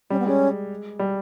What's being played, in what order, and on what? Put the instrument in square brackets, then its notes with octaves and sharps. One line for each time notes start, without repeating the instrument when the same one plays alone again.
[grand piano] G3 [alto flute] C#4
[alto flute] B3
[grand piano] G#3 [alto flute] C#4
[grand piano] G3